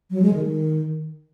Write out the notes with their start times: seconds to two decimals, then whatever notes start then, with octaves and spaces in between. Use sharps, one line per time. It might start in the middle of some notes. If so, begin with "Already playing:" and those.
0.11 F#3
0.22 G#3
0.34 D#3